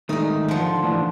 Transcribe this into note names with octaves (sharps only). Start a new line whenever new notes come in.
G#2 D#3 G3 A3 D#4
D3 F3
A2 E3 D4